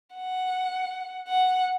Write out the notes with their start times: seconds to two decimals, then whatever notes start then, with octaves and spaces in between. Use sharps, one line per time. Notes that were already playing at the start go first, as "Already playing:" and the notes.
0.15 F#5
1.28 F#5